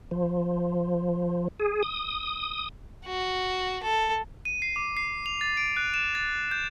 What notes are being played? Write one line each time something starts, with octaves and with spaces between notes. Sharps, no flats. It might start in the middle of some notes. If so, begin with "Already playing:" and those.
F3
G#4
D#6
F#4
A4
D#7
C7
D6
C7
F7
A6
D7
F#6
E7
A6
G6